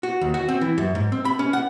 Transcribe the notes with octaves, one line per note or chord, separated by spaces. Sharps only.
F#4
D#2
F#4
C4
E3
F#2
G#2
C4
B5
C#4
F#5